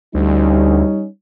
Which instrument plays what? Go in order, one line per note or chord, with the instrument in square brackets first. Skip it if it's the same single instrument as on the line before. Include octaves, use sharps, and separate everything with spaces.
[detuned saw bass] D2 [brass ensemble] G3 C#4 D#4